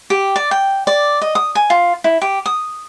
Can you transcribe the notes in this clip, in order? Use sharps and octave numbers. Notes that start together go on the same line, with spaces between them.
G4
D5
G5
D5
D#5
D#6
G#5
F4
E4
G4
D#6